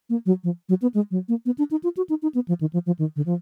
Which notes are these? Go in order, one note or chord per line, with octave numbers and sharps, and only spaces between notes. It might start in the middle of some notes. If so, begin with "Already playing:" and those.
A#3
F#3
F3
F#3
B3
G#3
F#3
A#3
B3
D4
D#4
F4
F#4
D#4
D#4
B3
F3
D#3
F3
F3
D#3
D3
F3